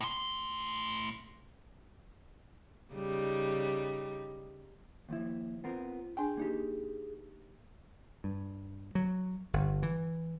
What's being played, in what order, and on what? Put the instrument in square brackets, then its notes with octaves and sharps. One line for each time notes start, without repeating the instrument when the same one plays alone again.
[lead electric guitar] A2 C6
[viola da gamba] C#3 G3 D#4
[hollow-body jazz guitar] D#2 F3 E4 [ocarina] A#3
[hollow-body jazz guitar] B3 C4 A#4 [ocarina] F4
[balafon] D4 G#5 [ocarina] G#4 [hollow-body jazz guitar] G5
[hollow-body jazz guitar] A#3 D#4 G4
[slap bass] G2
F#3
G1
E3